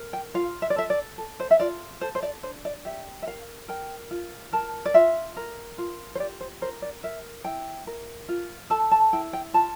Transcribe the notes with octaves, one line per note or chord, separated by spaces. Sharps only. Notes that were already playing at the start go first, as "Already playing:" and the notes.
Already playing: A#4
G5
F4 F5
E5
D5
A4 E5
D5
A4
C5
E5
F4 D5
A4 C5
C5
D5
D4 C5
D5
G4 E5
E5
A#4 F5
A#4 G5
F4
A#4 A5
D5
F4 E5
A#4
F4
C5
G4 D5
C5
A#4 C5
D5
A#4 E5
E4 G5
A#4
F4
A4 A5
A5
E4 G5
G5
F4 A5